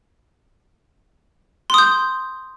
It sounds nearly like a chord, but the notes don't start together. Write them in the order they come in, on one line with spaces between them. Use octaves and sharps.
C6 D#6 G6